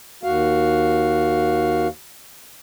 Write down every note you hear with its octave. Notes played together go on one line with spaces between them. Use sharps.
D#2 F#4 F5